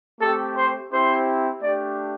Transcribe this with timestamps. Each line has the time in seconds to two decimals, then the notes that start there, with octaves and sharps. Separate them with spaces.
0.21 A3 C4 G4 A4
0.56 C5
0.92 C4 E4 G4 C5
1.63 A3 D4 G4 D5